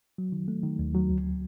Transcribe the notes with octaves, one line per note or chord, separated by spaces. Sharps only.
F#3
D#3
A3
D#3
D#2
F#3
D2